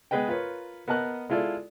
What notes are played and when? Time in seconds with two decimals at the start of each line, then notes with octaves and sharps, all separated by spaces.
0.11 G#3 B3 G#4 B4 D#5 G5
0.28 F4 A#4 B4 C#5
0.88 B3 A#4 D#5 A5 F#6
1.30 G#3 E4 F4 A4 D5